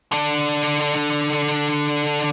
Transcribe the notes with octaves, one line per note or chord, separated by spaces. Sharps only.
D3 D4